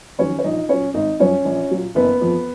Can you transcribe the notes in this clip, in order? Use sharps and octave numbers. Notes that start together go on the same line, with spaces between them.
F2 D#3 F#3 C#4 C#5
C#5
A#1 D#4 D#5
A#2 F#3 C#4 C#5
G#1 D#4 D#5
F#2 F3 C#4 C#5
A#1
A#2 F#3
F#1 B3 B4
F2 F3